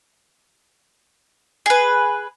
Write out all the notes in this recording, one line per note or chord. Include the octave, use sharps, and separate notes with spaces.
G#4 B4